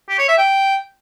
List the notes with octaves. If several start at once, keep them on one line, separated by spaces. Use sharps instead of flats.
G4
C#5
E5
G5